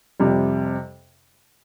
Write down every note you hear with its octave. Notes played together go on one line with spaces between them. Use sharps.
F2 C3 G3